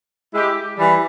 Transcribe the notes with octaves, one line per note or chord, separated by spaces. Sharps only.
G#3 E4 G4
E3 G3